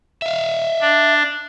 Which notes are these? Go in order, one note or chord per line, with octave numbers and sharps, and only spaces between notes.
E5 F5
D4